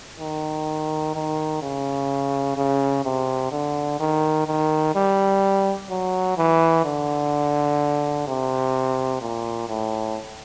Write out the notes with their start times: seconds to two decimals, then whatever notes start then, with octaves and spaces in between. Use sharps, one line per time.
0.20 D#3
1.15 D#3
1.62 C#3
2.57 C#3
3.05 C3
3.52 D3
4.00 D#3
4.47 D#3
4.95 G3
5.90 F#3
6.37 E3
6.85 D3
8.28 C3
9.22 A#2
9.69 A2